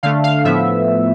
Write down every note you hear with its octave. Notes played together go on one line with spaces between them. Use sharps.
D3 A3 F5
F5
A2 F3 B3 E5